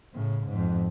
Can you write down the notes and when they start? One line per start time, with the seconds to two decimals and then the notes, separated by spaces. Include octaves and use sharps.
0.14 A2 C#3
0.48 F2 G#2